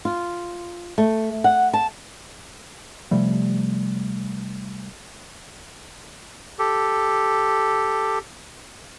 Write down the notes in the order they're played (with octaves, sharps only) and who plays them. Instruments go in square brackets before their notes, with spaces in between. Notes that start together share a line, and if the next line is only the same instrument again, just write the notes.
[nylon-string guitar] F4
A3
F#5
A5
[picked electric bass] C3 F3 G3 A3
[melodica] G4 A4